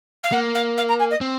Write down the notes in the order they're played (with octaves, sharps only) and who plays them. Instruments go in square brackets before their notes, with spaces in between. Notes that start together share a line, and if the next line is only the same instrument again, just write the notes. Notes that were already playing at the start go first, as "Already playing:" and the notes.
[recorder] F5
[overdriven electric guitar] A#3 [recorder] F#5
[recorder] F5
F5
A#5
G#5
D#5
[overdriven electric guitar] C4